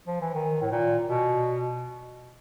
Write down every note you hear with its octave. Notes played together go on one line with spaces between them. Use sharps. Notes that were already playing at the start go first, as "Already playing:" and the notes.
F3
E3
D#3
A2
A#2
B2